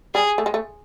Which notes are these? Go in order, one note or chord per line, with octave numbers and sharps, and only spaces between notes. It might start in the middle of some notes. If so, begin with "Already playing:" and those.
G3 G#4
A3
G#3
A3